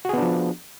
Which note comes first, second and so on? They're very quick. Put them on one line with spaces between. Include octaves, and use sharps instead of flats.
F#4 G#4 B3 D4 F3